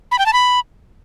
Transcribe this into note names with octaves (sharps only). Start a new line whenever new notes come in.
B5
G5
A5
B5